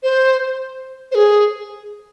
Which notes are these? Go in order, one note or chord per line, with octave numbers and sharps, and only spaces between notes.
C5
C5
G#4